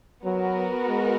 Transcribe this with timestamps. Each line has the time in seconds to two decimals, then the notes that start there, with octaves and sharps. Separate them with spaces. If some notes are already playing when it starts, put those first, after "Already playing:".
0.24 F#3 B3 F#4 A#4
0.89 G#3